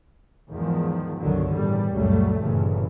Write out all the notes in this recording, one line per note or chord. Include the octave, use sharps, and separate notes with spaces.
E2 G#2 D#3 F3
G1 C2 B2 D3 D#3 F#3
E2 A2 G3
C#2 F#2 A#2 F#3 G3 A3
G1 G2 A#2 C#3 E3